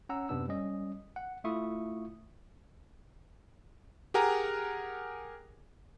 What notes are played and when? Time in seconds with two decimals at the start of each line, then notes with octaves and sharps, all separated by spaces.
0.09 C#4 F#5 A#5 E6
0.29 F#2 C3 B3 D4 E6
0.48 G3 C#4 D#5
1.16 F#5
1.44 A3 E4 F4 E5 C#6 D#6
4.14 G4 G#4 A#4 F#5 G#5 A#5